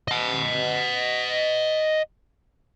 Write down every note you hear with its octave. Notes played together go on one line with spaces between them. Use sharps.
D#5 F#5